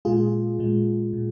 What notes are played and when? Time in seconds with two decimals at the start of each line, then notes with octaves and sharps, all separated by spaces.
0.05 A#2 G#3 F4 G#4
0.59 A#2 G#3
1.13 A#2